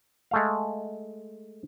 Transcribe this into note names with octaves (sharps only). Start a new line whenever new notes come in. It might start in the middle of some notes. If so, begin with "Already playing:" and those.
G#3 A3 F5